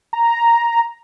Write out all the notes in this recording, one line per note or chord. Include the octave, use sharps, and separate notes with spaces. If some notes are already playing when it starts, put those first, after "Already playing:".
A#5